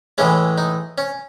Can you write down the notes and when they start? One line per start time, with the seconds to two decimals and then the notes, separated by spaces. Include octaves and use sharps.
0.18 A2 E3 G#3 C#4
0.58 D#4
0.98 C#4